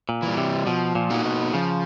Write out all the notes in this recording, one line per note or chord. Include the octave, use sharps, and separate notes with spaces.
A#2
E3
G3
C3
B2 F3
A#2
A#3 D#4 F#4
B2
C#3 F3